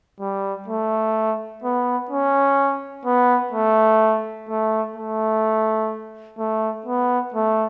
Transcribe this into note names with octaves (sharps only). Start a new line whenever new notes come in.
G3
A3
B3
C#4
B3
A3
A3
A3
A3
B3
A3